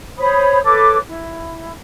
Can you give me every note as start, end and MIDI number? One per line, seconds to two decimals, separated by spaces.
0.18 0.59 72
0.18 0.59 73
0.18 0.59 83
0.18 0.59 87
0.63 0.97 69
0.63 0.97 71
0.63 0.97 73
0.63 0.97 86
1.07 1.72 64